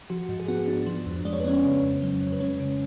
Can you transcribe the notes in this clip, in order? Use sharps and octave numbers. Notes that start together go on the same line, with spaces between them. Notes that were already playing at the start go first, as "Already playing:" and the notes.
F3 F#4
G#2
G#4
B3 F#4
D4
F3
F2
G#3 D5
C#5
B4
B3 C#4 C#5
C#3
F2
F#3
F2
B4
G#3 C#4 C#5
C#3